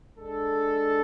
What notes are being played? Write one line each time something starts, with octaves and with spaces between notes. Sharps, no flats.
G#3 D4 A4